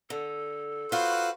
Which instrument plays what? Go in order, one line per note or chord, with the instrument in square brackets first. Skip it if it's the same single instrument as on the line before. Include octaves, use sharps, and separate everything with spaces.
[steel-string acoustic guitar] D3 [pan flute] A4
[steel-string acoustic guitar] F4 F5 [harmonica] F#4 B4 C5